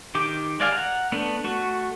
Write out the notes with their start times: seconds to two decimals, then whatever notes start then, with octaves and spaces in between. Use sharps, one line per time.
0.15 D#3 G4 D6
0.60 G#3 D5 F5 G#5
0.72 F#5 A#5
1.12 A3 B3 D4
1.44 A3 F#4